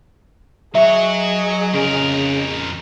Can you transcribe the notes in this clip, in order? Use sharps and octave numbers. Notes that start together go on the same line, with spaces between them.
F#3 G#4 C#5 D#5 E5
F2 C#3 A#4